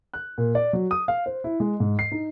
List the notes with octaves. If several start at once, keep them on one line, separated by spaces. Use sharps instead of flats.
F#6
A#2
D5
F#3
D#6
F5
C5
E4
G#3
G#2
C7
D#4